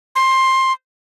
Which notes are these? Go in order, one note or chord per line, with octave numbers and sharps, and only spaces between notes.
C6